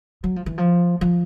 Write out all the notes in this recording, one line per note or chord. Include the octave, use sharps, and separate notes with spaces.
F#3
F3
E3
F3
F3